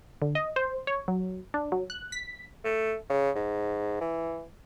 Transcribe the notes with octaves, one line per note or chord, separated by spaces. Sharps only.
D3
D#5
C5
C#5
F#3
D4
F#3
F#6
B6
A3
C#3
G#2
E3